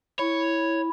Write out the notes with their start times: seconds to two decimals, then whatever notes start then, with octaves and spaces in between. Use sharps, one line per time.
0.19 E4 C#5